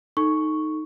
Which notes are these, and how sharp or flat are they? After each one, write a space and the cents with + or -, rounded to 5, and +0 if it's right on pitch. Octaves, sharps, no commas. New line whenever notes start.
D#4 +0 A4 +0 C#6 +0